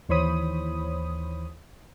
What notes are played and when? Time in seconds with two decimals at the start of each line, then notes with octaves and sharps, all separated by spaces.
0.09 D#2 E3 C5 C#5 B5 D#6